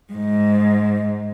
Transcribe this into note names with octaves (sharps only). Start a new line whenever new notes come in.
G#2